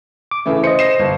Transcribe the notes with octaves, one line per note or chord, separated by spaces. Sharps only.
D6
C#3 E3 A3
C5 D#5 C#7
A#6 C7 E7
G1